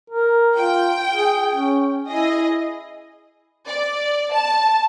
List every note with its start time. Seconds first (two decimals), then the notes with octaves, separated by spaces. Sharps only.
0.10 A#4
0.58 F4 G5
1.14 G#4
1.54 C#4
2.08 E4 G#4 D#5
3.67 D5
4.33 A5